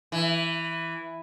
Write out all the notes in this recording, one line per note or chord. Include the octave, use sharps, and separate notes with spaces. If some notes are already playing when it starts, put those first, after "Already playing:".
E3